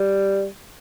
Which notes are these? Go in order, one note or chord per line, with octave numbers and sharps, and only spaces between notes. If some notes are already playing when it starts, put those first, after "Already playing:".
Already playing: G3